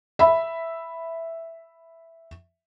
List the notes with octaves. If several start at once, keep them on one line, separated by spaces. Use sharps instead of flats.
E5 B5